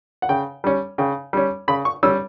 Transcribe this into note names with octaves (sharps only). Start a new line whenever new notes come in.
F#5
C#3 G5
G3 C#4
C#3 G5
G3 C#4
C#3 B5
C#6
G3 C#4 E6